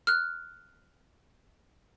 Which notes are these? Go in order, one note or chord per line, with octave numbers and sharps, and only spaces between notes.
F6 F#6